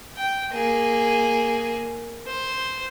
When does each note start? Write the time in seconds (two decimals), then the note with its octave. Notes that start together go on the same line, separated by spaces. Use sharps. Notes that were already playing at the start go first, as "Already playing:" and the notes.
0.17 G5
0.54 A#3 G#4
2.27 C5